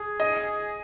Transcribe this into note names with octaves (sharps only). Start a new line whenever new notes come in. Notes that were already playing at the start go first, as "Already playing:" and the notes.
Already playing: G#4
D#5